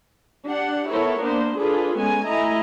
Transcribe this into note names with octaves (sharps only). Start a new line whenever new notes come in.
D4 G4 F#5
B3 E4 A4 A#4 C#5
A#3 B3 D4 C5
D4 F4 G#4 A4 B4
G#3 B3 C#4 G#5
A3 E4 D#5 G#5 A#5